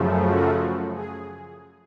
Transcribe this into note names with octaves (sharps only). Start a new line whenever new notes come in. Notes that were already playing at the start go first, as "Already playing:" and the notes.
Already playing: F#2 C#3 F3 A3
F#4
G#4